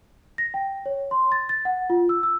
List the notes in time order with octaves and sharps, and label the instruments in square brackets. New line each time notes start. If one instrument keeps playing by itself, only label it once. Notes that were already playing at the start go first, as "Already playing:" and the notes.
[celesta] A#6
G5
C#5
C6
A6
A6
F#5
F4
E6
E6